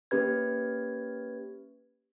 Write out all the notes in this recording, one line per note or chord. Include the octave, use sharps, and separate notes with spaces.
A#3 C#4 G4 B4 G#6